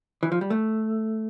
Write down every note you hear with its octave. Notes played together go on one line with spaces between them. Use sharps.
E3
F3
G3
A3